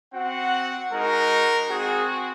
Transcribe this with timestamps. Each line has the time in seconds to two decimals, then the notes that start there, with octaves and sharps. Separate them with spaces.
0.13 C4 F#4 F#5
0.90 G#3 D#4 F#4 A#4
1.68 C4 F#4 G#4